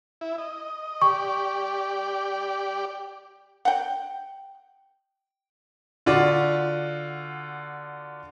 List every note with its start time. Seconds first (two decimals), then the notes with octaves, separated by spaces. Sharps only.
0.21 E4
0.38 D#5
1.02 G4 D5 C#6
3.65 F#5 G5
6.06 D3 F4 F#4 D5